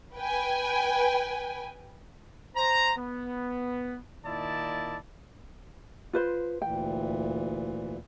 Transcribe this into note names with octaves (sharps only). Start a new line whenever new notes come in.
B4 G5 G#5
C5 A#5
B3
A#2 D#3 E4 D5 D#5 A5
F4 B4 C5
D2 A#2 E3 G5